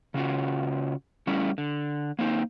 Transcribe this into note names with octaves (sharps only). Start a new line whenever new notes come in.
C#3 C#4 F4 F#4
G3 A3 C#4 E4
D3
A#3 C4 D#4